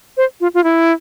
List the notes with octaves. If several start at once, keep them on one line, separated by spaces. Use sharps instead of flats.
C5
F4
F4
E4